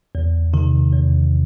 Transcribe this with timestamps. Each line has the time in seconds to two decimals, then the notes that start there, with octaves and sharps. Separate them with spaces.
0.15 E2
0.54 C3 D#3
0.92 E2